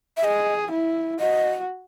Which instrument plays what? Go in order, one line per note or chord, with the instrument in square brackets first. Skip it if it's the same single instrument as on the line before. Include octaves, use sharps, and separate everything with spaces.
[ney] E5
[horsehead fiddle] G#4 [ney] D#5
[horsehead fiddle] E4
[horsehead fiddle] F#4 [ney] D#5